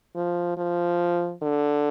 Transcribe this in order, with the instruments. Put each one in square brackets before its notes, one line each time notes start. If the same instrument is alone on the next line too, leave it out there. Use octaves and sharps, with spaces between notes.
[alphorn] F3
F3
D3